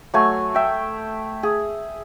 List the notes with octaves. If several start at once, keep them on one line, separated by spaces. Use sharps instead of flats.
F#3 A3 G#5
E5 G5
G#4